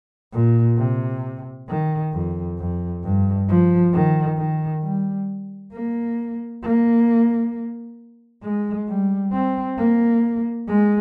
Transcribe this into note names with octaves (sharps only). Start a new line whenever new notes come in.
A#2
C3
D#3
F2
F2
G2
F3
D#3
D#3
G3
A#3
A#3
G#3
G3
C4
A#3
G#3